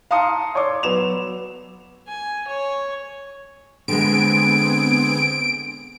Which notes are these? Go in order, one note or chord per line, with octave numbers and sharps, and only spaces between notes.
F5 A5 A#5 C6 D#6 C#7
C#5 D5 C6 D6 E6
F#3 B3 E7 F7
G#5
C#5
D3 G#3 B3 C4 G#5 D7